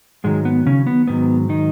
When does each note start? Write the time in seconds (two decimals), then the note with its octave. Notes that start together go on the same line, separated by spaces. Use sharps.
0.24 G#2 D#3 F#3 G#3
0.45 B3
0.66 C#3 C#4
0.87 B3
1.07 G#2 D#3 F#3 B3
1.49 D#3 D#4